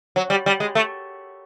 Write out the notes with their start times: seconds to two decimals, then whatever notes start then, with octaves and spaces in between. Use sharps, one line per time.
0.16 F#3
0.30 G3
0.46 G3
0.60 G#3
0.75 A3